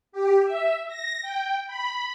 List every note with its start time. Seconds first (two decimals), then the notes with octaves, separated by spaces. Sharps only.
0.12 G4
0.45 E5
0.88 A#6
1.22 G5
1.67 B5